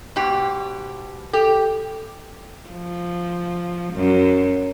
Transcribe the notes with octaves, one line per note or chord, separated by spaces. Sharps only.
G#2 B2 G4
G4 A4
F3
F#2